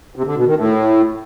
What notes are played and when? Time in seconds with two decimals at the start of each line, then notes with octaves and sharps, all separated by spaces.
0.16 C3
0.26 D3
0.36 B2
0.46 D#3
0.57 A2